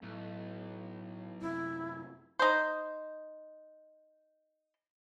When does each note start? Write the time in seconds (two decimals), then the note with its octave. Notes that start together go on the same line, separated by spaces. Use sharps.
0.03 B1 A2
1.42 F#2 C3 E4
2.39 D#4 C5